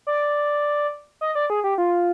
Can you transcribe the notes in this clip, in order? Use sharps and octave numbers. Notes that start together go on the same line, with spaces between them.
D5
D#5
D5
G#4
G4
F4